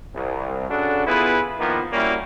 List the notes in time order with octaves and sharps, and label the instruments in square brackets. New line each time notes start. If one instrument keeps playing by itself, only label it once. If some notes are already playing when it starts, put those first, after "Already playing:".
[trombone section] C2
C#3 D4 F#4 A4
B3 E4 F4 G#4 B4
D#3 F3 A#3 B3
G3 A#3 C#4 E4 F#4